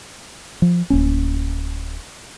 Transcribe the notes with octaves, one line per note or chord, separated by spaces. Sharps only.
F3
D1 A#3 C#4